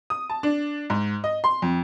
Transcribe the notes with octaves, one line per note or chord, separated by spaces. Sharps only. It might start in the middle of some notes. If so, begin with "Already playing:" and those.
D#6
A5
D4
G#2
D#5
C6
F2